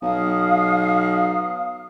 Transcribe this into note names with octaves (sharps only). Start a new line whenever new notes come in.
B1 F5 D#6